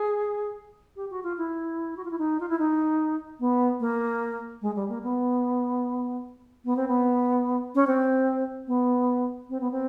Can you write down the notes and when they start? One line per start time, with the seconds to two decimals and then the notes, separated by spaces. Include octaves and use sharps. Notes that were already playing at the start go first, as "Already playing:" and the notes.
Already playing: G#4
0.95 G4
1.10 F#4
1.23 F4
1.37 E4
1.96 F#4
2.04 F4
2.10 E4
2.18 D#4
2.40 F4
2.48 E4
2.58 D#4
3.40 B3
3.80 A#3
4.61 G#3
4.75 G3
4.88 A#3
5.03 B3
6.65 B3
6.76 C4
6.87 B3
7.75 C#4
7.87 C4
8.67 B3
9.49 C4
9.60 B3
9.71 C4